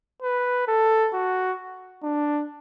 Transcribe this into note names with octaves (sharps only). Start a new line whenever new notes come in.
B4
A4
F#4
D4